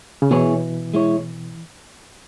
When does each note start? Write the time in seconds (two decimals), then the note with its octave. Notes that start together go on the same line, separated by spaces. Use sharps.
0.22 C#3
0.31 B2 E3 B3 E4 G#4 C#5
0.94 G#3 E4 C#5